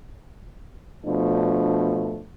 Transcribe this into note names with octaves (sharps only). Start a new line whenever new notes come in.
B2 F3 A3 D4